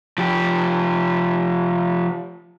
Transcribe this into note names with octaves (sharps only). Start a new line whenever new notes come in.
F3 G4